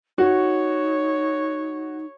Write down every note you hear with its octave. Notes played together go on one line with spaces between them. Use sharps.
D#4 F#4 C#5